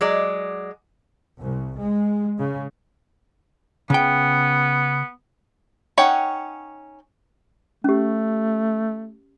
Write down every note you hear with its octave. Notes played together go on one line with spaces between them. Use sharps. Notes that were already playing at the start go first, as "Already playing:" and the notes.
F#3 G#3 D5
C2
G#3
C#3
C#3 B3 G5
C#4 D#4 C#5 F#5 G5
A3 C#4 G4